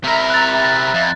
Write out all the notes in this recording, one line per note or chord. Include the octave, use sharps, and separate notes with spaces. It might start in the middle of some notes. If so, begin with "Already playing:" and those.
C3 A#4 E5 A#5 B5
F#6 A6
F2